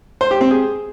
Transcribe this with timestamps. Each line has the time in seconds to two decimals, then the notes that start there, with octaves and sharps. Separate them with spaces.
0.21 C5
0.31 G4
0.41 C4
0.51 G#4